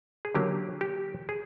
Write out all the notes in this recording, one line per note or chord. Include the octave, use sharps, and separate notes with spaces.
G#4
D3 F#3 A#3 C#4 E4 G4
G4
G#4